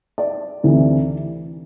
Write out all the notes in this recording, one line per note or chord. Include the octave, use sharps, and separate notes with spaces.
D5
D2 C3 E3